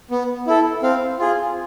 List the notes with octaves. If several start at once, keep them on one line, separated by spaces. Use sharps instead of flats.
B3
E4 A4
C4 F5
F4 G#4